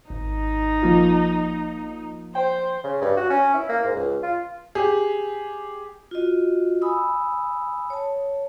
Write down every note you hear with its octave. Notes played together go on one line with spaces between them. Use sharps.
G#1 D#4
F3 A#3 F4
C5 G5
C#3
G2
F#4
C#4
E4
A#3
G#2
C#2
F4
G4 G#4
F4 F#4 D#5
G#5 B5 D#6 E6
C#5 A5